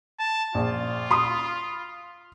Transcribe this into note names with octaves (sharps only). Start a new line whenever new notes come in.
A5
A#1 F4
B5 C6 D#6